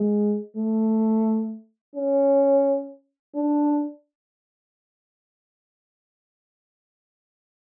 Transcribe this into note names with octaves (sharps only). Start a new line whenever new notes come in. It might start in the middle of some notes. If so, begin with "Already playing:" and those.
Already playing: G#3
A3
C#4
D4